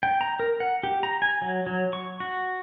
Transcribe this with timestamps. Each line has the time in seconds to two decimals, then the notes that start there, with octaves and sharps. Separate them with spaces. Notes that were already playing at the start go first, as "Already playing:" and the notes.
0.03 G5
0.21 A#5
0.40 A#4
0.60 F#5
0.83 G4
1.03 A#5
1.22 G#5
1.42 F#3
1.67 F#3
1.93 C#6
2.20 F#4